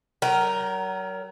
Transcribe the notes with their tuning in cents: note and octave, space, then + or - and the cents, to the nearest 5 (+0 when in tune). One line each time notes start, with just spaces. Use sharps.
F#3 +35 A#4 +0 G5 +0